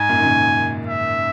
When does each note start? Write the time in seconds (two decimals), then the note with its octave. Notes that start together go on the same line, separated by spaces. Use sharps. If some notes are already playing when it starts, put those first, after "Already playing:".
Already playing: G#2 G#5
0.09 F#2 A#2
0.19 D#3
0.24 A#2 C#3
0.87 E5